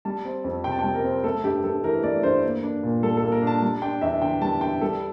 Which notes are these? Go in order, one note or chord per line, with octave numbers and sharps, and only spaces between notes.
G3 A5
C4
F2
C3 G5
A5
G3 G5
A#4
C4
A3 A4
G2 G4
G2 A4
E3 A#4
A3 D5
G2 C5
A#3
D4
A#2
G3 A4
A4
A#3
A#4
D4 A5
G3 A5
D4 G5
E2 E5
D3 G5
G3 A5
D4 G5
G3 A4